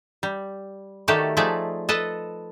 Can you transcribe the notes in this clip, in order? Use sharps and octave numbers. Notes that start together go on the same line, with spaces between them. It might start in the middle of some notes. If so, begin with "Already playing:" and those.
G3
D#3 A3 F#4 G4 A4 D5
F3 A3 D#4 G#4 D5 E5
A4 B4 D#5 A5